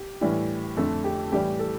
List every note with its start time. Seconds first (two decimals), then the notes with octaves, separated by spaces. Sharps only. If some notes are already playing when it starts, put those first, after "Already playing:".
Already playing: G4
0.21 A2 E3 G3
0.77 F2 D3 A3 A4
1.04 G4
1.32 A2 E3 G3 G4
1.59 A4